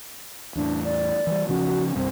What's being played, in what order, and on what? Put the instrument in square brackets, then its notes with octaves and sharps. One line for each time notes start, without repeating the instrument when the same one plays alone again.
[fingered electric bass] E2 A2 [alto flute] D4
[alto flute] D5
[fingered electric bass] E3 G3
[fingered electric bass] C#3 F3 C#4 [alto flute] F#4
[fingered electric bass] G1 C2 G2 [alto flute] C4